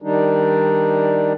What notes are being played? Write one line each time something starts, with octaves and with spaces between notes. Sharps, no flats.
D#3 G3 D4 D#4